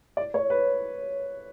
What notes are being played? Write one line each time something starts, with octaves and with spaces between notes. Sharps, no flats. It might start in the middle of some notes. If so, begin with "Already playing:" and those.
D5
C#5
B4